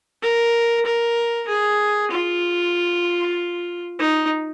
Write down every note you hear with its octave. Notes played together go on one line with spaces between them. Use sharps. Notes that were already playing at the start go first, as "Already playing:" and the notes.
A#4
A#4
G#4
F4
D#4